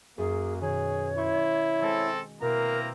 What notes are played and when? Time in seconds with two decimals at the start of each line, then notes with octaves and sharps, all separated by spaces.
0.18 F#2 A#3 G#4
0.61 B2 D#3 G#4 C#5
1.17 E4 C6 C#6 G6
1.82 G#3 C4 A4
2.42 B2 A#3 C4 E4 A#4 A#5